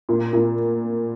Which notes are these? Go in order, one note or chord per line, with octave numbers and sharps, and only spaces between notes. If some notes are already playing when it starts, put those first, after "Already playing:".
A#2
A#2